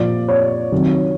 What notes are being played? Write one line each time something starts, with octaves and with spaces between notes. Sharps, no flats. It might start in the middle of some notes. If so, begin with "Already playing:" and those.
Already playing: A#2 F3 D5
C#5
C3 D#3 F#3